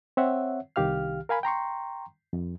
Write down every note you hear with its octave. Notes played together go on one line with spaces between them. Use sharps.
C4 C#5 E5 F#5
C2 D#3 G4 F5 F6
A#4 F5 G#5 B5
G5 A#5 C6 C#6
F2